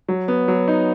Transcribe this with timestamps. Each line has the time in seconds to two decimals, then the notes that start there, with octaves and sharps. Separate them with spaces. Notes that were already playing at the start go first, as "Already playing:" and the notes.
0.08 F#3
0.28 B3
0.48 F#3
0.68 D#4